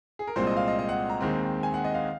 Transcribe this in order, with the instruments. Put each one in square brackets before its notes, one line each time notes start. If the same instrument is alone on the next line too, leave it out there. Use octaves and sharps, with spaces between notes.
[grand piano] G#4
A#4
C2 A#2 G#3 C4 C5
D#5
F5
D#5
D#5
F#5
A#5
D#2 D#3 G#3 C4
G#5
F#5
D#5
F5